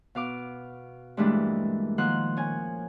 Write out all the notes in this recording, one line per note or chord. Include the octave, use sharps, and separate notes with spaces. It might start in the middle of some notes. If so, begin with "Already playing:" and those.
B2 F5 D6
G2 A#2 E3 G#3 A3 D4
D#3 F3 A#3 F#5 C6 F#6
C#4 G#5